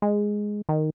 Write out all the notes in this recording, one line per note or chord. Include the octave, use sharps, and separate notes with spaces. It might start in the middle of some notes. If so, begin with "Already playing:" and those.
G#3
D#3